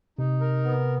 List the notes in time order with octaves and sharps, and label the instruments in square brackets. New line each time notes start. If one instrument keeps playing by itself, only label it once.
[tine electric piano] C3 [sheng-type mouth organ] D#4
[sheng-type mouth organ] A#4
B3